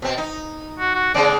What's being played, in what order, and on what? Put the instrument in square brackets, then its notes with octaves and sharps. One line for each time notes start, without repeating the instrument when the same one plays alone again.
[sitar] B2 C4
D#4
[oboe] F#4
F#4
[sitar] C#3 G#3 C4 [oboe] D5